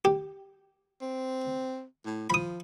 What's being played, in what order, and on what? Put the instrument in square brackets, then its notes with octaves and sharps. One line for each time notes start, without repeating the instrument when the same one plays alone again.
[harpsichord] G4
[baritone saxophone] C4
A2
[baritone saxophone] F3 [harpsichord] B5 D#6